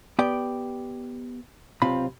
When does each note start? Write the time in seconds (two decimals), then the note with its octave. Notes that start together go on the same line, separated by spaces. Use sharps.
0.19 B3 G4 D5 G5
1.82 B1 C3 C4 F4 B5